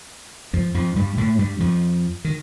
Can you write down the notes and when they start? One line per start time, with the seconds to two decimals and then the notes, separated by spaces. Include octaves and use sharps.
0.53 F2 F3
0.74 F2 F3
0.96 G2 G3
1.18 A2 A3
1.39 G2 G3
1.60 F2 F3
2.25 D#3